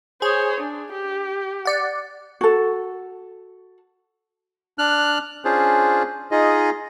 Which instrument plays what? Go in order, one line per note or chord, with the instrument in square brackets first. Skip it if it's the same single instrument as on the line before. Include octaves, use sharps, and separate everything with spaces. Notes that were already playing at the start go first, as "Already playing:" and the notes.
[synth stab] G#4 [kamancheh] C5 C#5
[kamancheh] D4
G4
[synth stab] D5 F#5
[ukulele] F#4 A4
[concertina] D4 F6 F#6
C#4 D4 F4 G#4 C5
D#4 F4 G#4 D#5